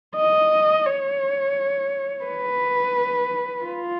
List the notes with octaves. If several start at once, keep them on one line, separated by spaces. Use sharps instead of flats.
D#5
C#5
B4
F4